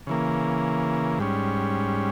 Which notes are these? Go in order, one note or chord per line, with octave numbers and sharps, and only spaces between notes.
C#3 E3 A#3
G#2 G3 C#4